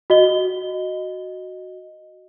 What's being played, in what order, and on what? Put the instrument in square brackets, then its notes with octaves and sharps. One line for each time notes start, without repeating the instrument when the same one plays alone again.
[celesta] F#4 D#5 G7